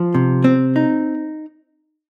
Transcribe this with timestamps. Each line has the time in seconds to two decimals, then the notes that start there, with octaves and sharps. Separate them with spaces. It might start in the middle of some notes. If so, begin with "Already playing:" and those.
Already playing: F3
0.14 C3
0.44 C4
0.76 D#4